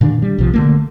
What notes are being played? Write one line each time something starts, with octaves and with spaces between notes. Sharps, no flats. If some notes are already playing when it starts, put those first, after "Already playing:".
A#2 D#3 C4 D4
G3
A#1 C3 F3
D3 A3 A#3